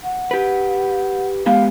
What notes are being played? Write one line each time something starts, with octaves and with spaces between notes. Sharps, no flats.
F#5
G4 B4
G#3 B3 G4 F5